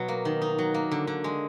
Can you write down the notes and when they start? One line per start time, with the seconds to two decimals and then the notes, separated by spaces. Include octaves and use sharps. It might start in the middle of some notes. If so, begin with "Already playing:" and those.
Already playing: B2 F#3
0.08 A#3
0.25 D#3
0.42 D#4
0.58 F#3
0.74 A#3
0.91 D3
1.07 D3
1.24 G#3